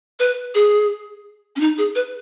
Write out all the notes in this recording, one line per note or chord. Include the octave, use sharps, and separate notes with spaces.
B4
G#4
C#4
D#4
G#4
B4